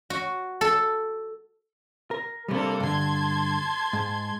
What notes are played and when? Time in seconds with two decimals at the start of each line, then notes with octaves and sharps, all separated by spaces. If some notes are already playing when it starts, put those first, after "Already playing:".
0.10 F#4
0.61 A4
2.11 A#4
2.48 C3 G3 A#3 D4 A4
2.80 G2 D3 A5 C6 G#6
3.93 G#2